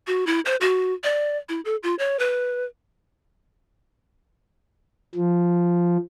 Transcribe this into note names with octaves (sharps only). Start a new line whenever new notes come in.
F#4
E4
C5
F#4
D5
E4
A4
F4
C#5
B4
F3